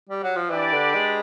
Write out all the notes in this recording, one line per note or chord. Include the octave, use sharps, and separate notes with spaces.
G3
F#3
F3
E3 D4 G4 B4 D5
D3
G#3